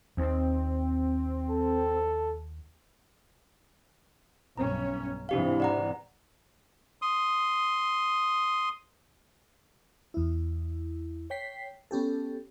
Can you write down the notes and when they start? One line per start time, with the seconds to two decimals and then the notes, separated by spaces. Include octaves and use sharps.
0.17 D#2 C4
1.50 A4
4.57 B1 G2 C#4 A#5
5.29 G#2 C3 E3 D4 G4 F5
5.60 D5 F#5 A#5
7.02 C6 D#6
10.14 E2 E4
11.30 C#5 G5 B6 C7
11.91 B3 C#4 G4 A4